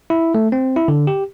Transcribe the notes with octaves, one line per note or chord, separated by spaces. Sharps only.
E4
A3
C4
E4
D3
G4